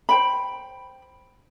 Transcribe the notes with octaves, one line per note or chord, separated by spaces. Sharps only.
C5 G5 B5